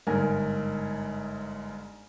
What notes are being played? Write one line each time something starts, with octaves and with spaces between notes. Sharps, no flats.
G1 G#2 A#4 G#5